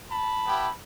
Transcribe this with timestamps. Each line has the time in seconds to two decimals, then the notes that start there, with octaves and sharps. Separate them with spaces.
0.11 A5 B5
0.45 B3 E4 G4